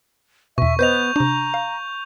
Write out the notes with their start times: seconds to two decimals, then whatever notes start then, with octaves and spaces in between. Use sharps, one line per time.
0.58 E2 B2 E5 C#6
0.79 B3 B4 C5 D#5 G6 F7
1.16 C3 D4 A#5
1.54 F5